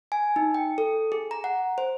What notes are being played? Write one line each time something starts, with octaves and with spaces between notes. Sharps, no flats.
G#5
D#4
G5
A4
G#4
A#5
F#5
C5